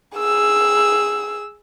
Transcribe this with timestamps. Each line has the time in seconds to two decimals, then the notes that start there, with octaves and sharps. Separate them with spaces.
0.16 G#4 E6